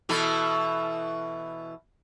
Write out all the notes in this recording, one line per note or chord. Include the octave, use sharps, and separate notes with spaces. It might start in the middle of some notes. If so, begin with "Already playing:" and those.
B2 E3 A4